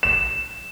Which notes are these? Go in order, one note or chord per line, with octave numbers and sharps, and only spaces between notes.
E7